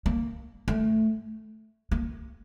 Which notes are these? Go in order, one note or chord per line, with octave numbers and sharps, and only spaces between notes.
A#3
A3
A#3